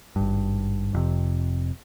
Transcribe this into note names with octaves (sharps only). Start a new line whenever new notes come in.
G#1 G2
F1 F2 C3